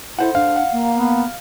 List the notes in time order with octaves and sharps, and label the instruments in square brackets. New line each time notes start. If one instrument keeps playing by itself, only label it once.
[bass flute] E4 [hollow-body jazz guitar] A4 C5 F#5
[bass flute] D4 [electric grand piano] F5
[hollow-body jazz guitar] F#5
[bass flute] A#3
[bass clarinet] B3